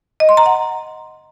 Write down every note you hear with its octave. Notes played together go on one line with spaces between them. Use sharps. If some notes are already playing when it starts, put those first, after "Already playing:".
D#5
C6
A#5
F#5